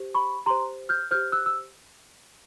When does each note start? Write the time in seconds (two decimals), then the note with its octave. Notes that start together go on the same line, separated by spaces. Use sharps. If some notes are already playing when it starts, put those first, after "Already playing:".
Already playing: G4 C5
0.15 B5 C#6
0.46 G4 C5 A#5 C6
0.89 F6 G6
1.11 G4 C5 F6 G6
1.32 E6 F#6
1.46 E6